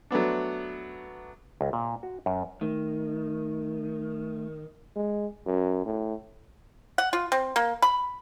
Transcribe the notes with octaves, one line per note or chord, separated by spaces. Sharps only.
F#3 A3 B3 D4
C#2
A#2
F#4
F#2
D#3 A3
G#3
F#2
A2
F#5
F4
C4
A#3
B5